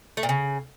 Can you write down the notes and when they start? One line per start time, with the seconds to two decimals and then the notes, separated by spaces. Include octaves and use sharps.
0.17 A3
0.23 A#2
0.29 C#3